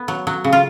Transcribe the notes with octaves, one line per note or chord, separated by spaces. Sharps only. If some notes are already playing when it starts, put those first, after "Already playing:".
Already playing: B3
F#3
F#3
C#3
F4